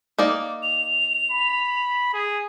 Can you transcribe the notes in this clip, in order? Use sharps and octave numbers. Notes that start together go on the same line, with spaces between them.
A#3 D#4 D5
F7
B5
G#4